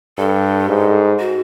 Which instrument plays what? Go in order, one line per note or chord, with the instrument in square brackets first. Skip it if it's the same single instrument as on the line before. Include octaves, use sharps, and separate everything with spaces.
[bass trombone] G2 [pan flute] A4
[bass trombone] G#2
[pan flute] F#4